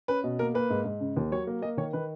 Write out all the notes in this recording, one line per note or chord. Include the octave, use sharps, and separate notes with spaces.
C#4 B4
B2
A#3 A#4
A#3 B4
G#2
G#2
C#3
D#2
F#3 C#5
A#3
A#3 D#5
D#3 C#5
D#3 B4